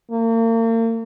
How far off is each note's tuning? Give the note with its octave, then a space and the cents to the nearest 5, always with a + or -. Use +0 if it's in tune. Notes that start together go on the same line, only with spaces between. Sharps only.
A#3 -40